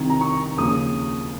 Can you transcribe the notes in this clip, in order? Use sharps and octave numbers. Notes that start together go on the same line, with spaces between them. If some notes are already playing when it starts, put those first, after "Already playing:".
Already playing: C2 C3 D#3
A#5
C#6
D#2 C#3 F3 D#6